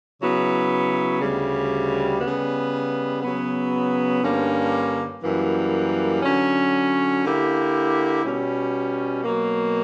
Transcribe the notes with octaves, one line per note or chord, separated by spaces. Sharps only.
C#3 F#3 B3 E4
D2 C#3 G3
C#3 G3 B3
C#3 F#3 B3
G2 D3 A#3 C#4
F#2 E3 G3 A#3
D3 F#3 C#4
D3 A#3 E4 G4
B2 G3 C#4
B2 F#3 A#3